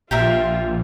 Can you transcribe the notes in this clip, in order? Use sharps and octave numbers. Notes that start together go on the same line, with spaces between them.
A#1 F4 G4 A#4 E5